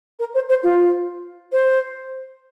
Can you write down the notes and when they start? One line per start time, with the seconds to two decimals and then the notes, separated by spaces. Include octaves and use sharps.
0.19 A#4
0.34 C5
0.49 C5
0.63 F4
1.52 C5